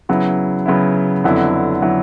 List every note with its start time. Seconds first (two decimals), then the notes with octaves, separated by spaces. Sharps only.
0.09 C#3 F#3 B3 E4
0.66 C#3 F#3 B3 E4
1.24 F2 D3 F#3 B3 E4
1.82 D3 F#3 B3 E4